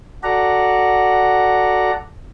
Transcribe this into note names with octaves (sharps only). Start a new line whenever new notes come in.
F#4 A4 D5 F#5 A#5